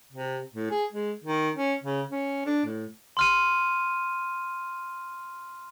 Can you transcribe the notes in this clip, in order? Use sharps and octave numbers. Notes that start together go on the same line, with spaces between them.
C3
A2
G#4
G#3
D#3
C#4
C#3
C#4
D4
A2
C6 F6 D#7